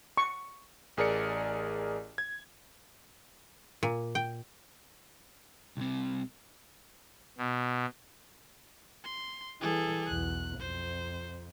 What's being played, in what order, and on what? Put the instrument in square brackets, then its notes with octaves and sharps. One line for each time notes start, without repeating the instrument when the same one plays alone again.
[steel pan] C#6
[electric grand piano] A1 G#4 A#4 D5 C#7
G#6
[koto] A#2
G5
[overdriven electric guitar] C2 C3
[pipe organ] B2
[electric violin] C6
[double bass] E3 G3 [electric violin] G#4 A4
[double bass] B1 E2 [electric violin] F#6
[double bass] F2 [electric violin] C5